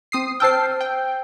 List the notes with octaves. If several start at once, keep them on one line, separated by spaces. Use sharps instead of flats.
C4 D#6 C7
C5 G5 A5 E6 F6 C7
G5